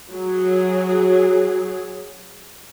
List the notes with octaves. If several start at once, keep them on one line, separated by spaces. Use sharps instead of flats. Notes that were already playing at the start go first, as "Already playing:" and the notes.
F#3 G#4